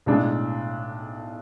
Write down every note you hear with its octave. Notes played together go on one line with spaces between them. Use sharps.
B1 A2 G#3 D4